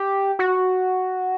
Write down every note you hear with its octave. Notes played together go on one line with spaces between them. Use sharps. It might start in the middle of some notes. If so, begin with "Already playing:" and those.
Already playing: G4
F#4